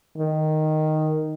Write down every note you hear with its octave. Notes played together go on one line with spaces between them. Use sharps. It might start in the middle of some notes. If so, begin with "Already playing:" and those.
D#3